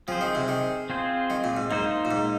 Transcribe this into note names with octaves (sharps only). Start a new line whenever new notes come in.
F3 C4 G#4 C5
D#3
C3
D#3
C4 F4 G#4 C5
D#3
A#2
G#2
G#2 A#3 D#4 C5
A#2
G#2